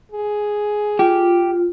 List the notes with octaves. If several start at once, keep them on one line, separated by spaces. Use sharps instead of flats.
G#4
F4 G4